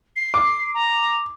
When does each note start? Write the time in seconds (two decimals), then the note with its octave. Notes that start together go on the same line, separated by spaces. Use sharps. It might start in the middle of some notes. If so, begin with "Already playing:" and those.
0.16 C7
0.34 D6
0.74 A#5